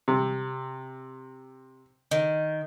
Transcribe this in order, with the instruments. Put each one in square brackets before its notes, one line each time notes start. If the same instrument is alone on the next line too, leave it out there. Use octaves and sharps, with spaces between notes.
[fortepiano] C3
[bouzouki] D#3